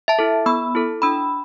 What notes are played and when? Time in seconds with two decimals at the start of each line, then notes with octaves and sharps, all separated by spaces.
0.08 E5 A5
0.19 E4 A4
0.46 B3 B5 E6
0.75 E4 A4
1.02 D4 B5 E6